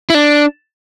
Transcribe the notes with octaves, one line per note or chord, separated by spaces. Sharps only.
E4
D4